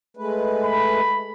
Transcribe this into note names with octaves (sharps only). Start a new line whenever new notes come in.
G#3 A3 B4
B5